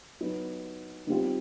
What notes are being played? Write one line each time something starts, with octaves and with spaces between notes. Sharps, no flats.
F#3 B3 D#4
D#3 G3 C4 F4